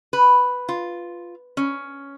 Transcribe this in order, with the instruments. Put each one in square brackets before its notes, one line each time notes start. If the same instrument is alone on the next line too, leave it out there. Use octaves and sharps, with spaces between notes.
[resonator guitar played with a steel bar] B4
F4
C#4